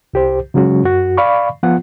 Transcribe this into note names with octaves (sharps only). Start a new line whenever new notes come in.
C2 G4 C5
C#3 F#3 G#3 C#4 F#4
F#2 F#4
D5 F5 B5 C#6
F3 B3 F4 F#5